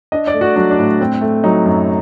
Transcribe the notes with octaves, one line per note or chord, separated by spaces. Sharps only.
D4 D#5
D5
A3
F#4
F#3 D4
D4
A2
C4
A3
F#3 D#4
F#2